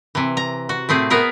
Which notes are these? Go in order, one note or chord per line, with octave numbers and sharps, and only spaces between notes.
C3 E3
A#5
F#4
A2 A3 C4 G#4
B3 G#4 A#4 B4